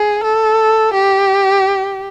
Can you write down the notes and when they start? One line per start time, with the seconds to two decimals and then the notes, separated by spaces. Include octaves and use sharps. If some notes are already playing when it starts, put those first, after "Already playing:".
Already playing: G#4
0.24 A4
0.94 G4